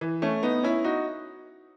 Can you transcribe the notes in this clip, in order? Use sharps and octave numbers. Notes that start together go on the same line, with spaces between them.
E3
A3 C#4
B3 D#4
C#4 E4
D#4 F#4